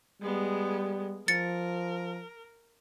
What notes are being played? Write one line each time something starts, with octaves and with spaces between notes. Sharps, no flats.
G3 G#3 B3
F3 A#4 A6 C#7